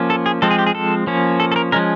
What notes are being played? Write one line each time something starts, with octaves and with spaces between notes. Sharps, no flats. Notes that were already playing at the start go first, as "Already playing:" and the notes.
Already playing: F3 A#3 C#4
A4
G#4
F3 G#3 C4 A4
G#4
G4
G#4
A4
F3 A#3 C#4
A4
A4
A#4
F3 G#3 C#4 A#4